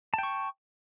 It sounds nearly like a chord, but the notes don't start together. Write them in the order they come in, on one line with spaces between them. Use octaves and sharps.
A5 G5 C#6